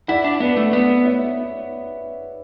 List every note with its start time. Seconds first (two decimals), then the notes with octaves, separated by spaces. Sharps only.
0.08 E4 D5 F#5
0.24 D4
0.40 B3 B4 D5
0.57 A3
0.73 B3 B4 D5
1.05 C#5 E5